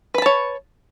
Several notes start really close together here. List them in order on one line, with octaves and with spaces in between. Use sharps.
B4 B5 A5 C#5